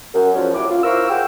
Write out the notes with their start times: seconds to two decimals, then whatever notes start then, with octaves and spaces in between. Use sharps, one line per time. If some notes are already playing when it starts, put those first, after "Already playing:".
0.14 F#2
0.34 G#2 D3 F3 F#3 C#4
0.55 D#2 A2 F#3 E4 D6
0.70 F4
0.84 E4 A#4 C5 F5 C#6 E6
1.10 F#2 G#4 C5 F#5 G5